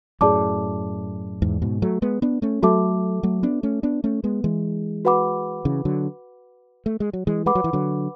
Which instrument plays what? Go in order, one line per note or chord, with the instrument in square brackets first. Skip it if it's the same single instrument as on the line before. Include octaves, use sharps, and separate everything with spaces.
[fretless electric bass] F#2 A2 [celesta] G#4 D5 A5 D6
[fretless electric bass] E2 G#2
G#2 B2
F#3 A3
G#3 B3
B3 D4
A3 C#4
[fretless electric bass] F#3 A3 [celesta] F#4 A4 E5 A5 D6
[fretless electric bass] F#3 A3
B3 D4
A3 C#4
B3 D4
A3 C#4
G#3 B3
E3 G#3
[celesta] F#4 B4 F#5 B5 D6
[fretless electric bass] C#3 E3
D3 F#3
A3
G#3
F#3
E3 G#3
[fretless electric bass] G#3 [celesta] B4 F#5 B5 D6
[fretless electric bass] F#3
E3
D3 F#3